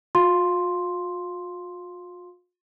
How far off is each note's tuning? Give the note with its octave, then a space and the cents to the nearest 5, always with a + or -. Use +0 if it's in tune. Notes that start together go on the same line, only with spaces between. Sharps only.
F4 +45 F5 +0 C6 +0